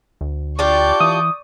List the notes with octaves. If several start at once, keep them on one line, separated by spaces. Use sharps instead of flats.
D2
D4 F4 G4 D5 C#6 G6
E3 D#6